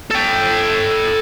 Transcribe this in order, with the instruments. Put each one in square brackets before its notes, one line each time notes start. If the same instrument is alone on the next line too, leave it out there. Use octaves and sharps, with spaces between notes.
[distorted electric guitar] A4 G5